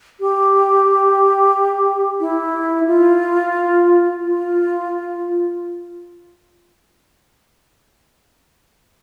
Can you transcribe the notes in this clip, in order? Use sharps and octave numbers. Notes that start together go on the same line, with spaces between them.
G4
E4
F4
F4